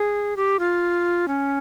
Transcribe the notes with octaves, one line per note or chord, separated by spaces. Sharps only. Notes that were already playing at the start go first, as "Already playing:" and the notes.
Already playing: G#4
G4
F4
C#4